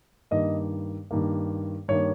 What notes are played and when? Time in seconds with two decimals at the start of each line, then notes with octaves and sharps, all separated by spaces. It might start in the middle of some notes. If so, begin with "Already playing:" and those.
0.31 G2 D#3 A#3 D#5
1.11 G2 D#3 A#3
1.88 G2 D#3 A#3 C#5